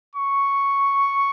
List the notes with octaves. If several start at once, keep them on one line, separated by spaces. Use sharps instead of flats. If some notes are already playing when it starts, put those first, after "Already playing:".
C#6